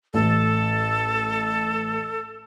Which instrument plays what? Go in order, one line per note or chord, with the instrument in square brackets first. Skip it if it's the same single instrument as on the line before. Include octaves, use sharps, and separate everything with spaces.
[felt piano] A1 [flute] A4